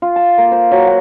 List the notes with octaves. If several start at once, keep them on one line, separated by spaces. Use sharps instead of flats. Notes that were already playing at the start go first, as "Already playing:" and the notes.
F4
A5
A#3
C5
F#3
F#5